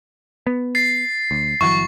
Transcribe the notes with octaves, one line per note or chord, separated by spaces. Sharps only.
B3
A6 C7
D2
G1 E3 F#3 C#6